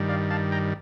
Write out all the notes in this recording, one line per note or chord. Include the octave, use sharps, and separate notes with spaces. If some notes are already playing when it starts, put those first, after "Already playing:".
Already playing: G2 D#3 G3
D5 F5
F5 A5
G5 A#5